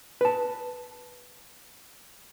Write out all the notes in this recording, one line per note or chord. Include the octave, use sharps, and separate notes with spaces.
B4 A5